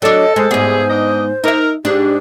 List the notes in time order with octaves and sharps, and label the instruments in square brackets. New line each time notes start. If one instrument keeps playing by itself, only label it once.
[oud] F#3 D4 [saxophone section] A4 [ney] D#5
[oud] G#3 [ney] C5
[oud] G#2 B3 [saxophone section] G3 A3 G#4
[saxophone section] D4 D#4 D#5
[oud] D#4 E5 [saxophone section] A#4
[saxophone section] G#2 [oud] D4 [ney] G4